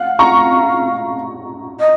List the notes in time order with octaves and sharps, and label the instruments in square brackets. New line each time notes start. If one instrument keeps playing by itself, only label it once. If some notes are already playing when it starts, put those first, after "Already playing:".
Already playing: [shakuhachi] F5 [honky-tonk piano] F#5
[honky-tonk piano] A#5 C#6
[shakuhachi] D#5